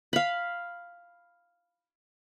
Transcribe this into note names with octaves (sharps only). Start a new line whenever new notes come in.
F5 B5